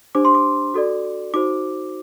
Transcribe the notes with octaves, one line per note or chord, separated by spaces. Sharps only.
D4 G4 C5 D6
C6
D6
F#4 A4 D5
D#4 F#4 C5 D6